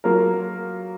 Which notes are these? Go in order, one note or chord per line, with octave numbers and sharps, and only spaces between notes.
F#3 A#3 F4 A#4